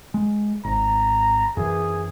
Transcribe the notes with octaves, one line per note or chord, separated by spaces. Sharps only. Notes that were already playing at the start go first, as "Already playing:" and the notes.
G#3
G#1 A#5
F#2 E3 G#4